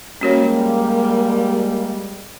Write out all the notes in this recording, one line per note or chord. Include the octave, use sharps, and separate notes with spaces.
G3 G#3 A#3 C#4 F#4 C#5